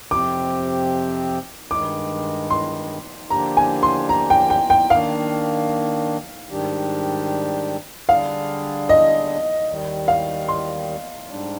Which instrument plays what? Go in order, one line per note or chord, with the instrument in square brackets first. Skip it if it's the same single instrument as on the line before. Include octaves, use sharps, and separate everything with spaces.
[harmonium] F2 C3 F3 C4 G4 [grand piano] D6
[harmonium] G2 D#3 G#3 [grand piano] D6
[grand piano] C6
[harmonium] D3 F3 A#3 D4 G4 [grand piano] A#5
[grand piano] G#5
C6
A#5
G5
G5
G5
[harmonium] D#3 A#3 D4 [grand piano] F5
[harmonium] G#2 D#3 G3 D4 G4
[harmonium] D3 G3 D4 G#4 [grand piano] F5
[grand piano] D#5
[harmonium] D#2 D#3 G3
[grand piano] F5
C6
[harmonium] G#2 G3 D4